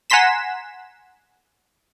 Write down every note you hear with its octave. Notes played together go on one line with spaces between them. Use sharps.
F#5 G#5 A#5 C6 B6 E7